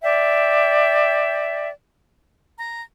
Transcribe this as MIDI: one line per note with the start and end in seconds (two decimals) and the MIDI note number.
0.02 1.69 74
0.02 1.69 76
0.02 1.69 79
2.57 2.82 82